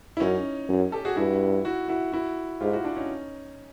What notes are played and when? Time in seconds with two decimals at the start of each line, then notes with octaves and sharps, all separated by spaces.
0.17 E4
0.20 F#2 C#4 D#4
0.69 F#2
0.92 G4 A4
1.05 F#4 G#4
1.17 G2 E4 F#4
1.65 E4 F#4
1.88 E4 F#4
2.12 E4 F#4
2.61 G#2 F4 G4
2.73 E4 F#4
2.84 D4 E4
2.96 C#4 D#4